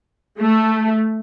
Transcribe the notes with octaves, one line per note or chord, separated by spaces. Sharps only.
A3